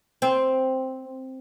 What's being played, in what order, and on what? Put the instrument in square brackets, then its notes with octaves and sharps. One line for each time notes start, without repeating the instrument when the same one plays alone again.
[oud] C4